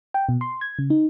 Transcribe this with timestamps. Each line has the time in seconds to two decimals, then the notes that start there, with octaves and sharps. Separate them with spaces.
0.14 G5
0.29 B2
0.41 C6
0.61 G#6
0.79 C#3
0.90 D#4